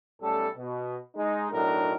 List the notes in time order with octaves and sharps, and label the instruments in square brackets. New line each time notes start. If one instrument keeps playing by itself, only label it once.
[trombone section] B1 G3 A3 C#4 A4
B2
G#3 D#4
B1 A2 F#3 D4 D#4 A#4